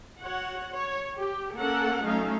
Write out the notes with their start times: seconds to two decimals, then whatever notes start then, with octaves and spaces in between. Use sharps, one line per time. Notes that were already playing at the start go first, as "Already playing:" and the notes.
0.23 F#4 C#5 F#5
0.72 C#5
1.17 G4
1.57 A#3 C#4 A4 A#4 F#5
2.03 F#3 A3 C#4 D#4 A4 F5